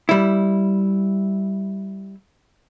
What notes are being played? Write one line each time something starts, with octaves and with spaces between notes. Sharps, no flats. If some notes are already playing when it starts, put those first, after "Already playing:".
G3 E4